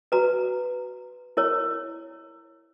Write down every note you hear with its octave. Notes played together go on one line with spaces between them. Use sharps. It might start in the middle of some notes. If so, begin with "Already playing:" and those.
F#4 B4 A#5
E4 A#4 C#5